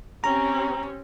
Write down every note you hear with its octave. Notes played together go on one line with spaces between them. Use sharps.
C4 C#4 G4 A#5